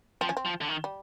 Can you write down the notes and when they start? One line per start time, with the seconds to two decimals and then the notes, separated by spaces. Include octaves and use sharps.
0.21 F3 C4
0.29 C#4
0.37 C4
0.45 F3
0.61 D3
0.68 D#3
0.84 G3